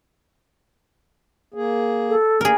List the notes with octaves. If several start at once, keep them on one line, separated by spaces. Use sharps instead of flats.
A#3 G#4
A4
A#3 G#4 A#4